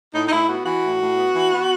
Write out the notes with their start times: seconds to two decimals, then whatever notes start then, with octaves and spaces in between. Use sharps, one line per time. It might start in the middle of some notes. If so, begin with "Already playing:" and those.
0.14 A2 D#4
0.27 D#4
0.31 A2 E4
0.49 B3 F#4
0.66 E3 F#4
0.83 A2
1.00 A2
1.17 B3
1.34 E3
1.51 B3